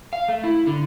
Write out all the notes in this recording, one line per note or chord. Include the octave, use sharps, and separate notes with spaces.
F5
A3
E4
D3